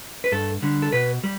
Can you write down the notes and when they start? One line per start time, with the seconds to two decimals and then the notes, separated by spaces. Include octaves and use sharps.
0.24 B4
0.32 G2 A4
0.62 D3 G3
0.82 A4
0.93 B2 B4
1.24 G3